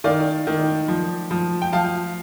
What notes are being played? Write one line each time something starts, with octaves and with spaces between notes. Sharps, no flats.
D#3 D5 F5
D#3
F3
F3
G5
F3 F5 A5